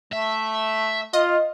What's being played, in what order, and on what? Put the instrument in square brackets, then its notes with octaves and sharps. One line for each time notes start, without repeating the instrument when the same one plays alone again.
[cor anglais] A3 [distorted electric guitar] E5
[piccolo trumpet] F4 [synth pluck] D#5